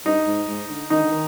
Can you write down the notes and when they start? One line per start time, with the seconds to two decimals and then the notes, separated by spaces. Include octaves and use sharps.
0.05 G2 D#4
0.27 G#2
0.48 G#2
0.69 D3
0.90 D#3 D#4
1.01 D3
1.12 D#3